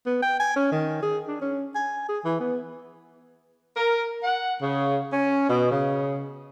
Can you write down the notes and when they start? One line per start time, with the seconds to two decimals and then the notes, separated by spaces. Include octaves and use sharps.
0.06 B3
0.22 G5
0.40 G#5
0.56 C#4
0.72 D#3
1.02 G#4
1.28 D4
1.41 C#4
1.75 G#5
2.09 G#4
2.25 E3
2.40 B3
3.76 A#4
4.24 F#5
4.61 C#3
5.12 C#4
5.49 B2
5.72 C#3